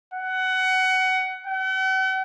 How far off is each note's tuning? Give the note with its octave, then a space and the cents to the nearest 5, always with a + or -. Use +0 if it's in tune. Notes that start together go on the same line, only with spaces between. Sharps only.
F#5 +20
F#5 +45